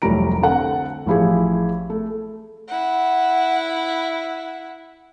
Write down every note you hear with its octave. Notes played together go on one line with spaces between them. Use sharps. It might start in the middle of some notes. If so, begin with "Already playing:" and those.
F1 C2 F#3 G3 A#5 D7
D3 C4 A4 F#5
A1 F3 E4 G4 G#4
A3
E4 F#5